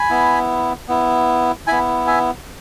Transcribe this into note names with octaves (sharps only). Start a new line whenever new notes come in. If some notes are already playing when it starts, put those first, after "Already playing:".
Already playing: G#5 B5
B3 E4
B3 E4
B3 E4 G#5 B5
E5 G#5